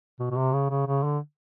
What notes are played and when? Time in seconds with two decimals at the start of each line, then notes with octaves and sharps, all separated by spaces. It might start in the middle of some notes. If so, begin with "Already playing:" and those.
0.19 B2
0.31 B2
0.36 C3
0.53 C#3
0.70 C#3
0.86 C#3
1.03 D3